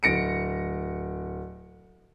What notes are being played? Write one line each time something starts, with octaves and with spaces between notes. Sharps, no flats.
D1 A#6 C#7 D7